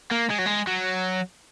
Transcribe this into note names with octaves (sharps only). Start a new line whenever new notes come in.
A#3
G#3
F#3
G#3
F#3